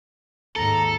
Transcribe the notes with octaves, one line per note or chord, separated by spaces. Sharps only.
D#2 G#2 A4 A#5